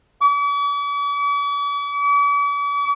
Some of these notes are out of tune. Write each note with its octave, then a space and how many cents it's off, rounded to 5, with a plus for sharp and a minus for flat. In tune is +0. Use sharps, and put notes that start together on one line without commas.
D6 -45